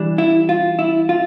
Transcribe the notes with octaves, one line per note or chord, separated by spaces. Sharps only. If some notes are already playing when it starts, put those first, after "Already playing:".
Already playing: E3 G3 D4
E4
F4
E4
F4